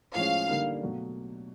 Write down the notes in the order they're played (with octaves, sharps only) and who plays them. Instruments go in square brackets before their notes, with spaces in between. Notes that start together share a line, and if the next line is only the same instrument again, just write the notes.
[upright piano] A2 F3 G#3 C#4 [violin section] F5
[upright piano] D3 G3 A#3 D#4
B2 F#3 A3